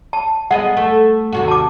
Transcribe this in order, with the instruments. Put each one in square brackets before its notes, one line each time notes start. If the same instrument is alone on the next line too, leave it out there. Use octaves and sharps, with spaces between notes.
[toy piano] A5
[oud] G#3 B3 D#5 [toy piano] F#5
[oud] A3
D#2 C3 F#4
[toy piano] A5 D6